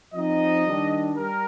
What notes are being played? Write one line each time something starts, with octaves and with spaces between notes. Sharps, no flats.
F3 C4 D#4 D#5
D#3 G3 D4
G3 A#4